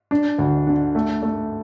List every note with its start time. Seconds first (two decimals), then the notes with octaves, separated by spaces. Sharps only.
0.11 D4
0.39 D2
0.67 D3
0.95 A3
1.23 A3